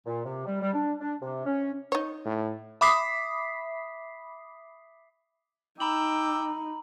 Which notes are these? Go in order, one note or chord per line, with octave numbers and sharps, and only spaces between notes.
A#2
C3
G3
G3
D4
D4
C3
C#4
D#4 C#5
A2
E5 B5 D6 D#6 B6 C7
D#4 G5 A#5 B5 D6 E6 F#7